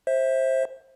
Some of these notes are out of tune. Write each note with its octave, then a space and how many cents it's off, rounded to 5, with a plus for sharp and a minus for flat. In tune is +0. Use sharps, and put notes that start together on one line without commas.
C5 +20 E5 -10